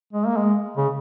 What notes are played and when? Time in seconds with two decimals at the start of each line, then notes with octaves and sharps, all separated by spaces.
0.13 G#3
0.27 A#3
0.37 G#3
0.77 C#3